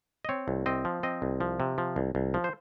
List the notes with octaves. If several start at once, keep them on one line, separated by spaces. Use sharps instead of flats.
D#5
C4 C#5
C2
C4 D#5
F3
C4 D#5
C2
F3
C3
F3
C2
C2
F3
C5